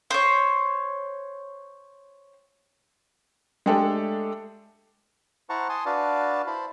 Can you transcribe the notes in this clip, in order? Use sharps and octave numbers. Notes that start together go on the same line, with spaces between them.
C5 C#5
G#3 A3 D4 G4 A4
E4 C5 F#5 A5 A#5 C#6
G#5 A5 C6 D#6
D4 F#4 B4 D5 F5 A5
E4 C5 A5 B5